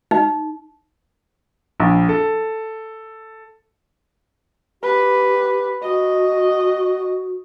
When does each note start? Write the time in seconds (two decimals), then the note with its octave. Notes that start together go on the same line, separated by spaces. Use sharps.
0.11 D#4
1.80 A#1
2.09 A4
4.82 G4 B4
5.83 F#4 D#5